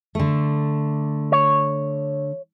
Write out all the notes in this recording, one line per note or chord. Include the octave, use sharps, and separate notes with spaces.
D3 A3
C#5